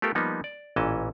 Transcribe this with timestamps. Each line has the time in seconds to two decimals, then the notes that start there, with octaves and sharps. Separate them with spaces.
0.02 A3 B3 F4 G4 A4 A#4
0.15 F3 G3 A#3 B3 D#4
0.44 D5
0.76 A1 A#2 E3 C#4 D#5 A5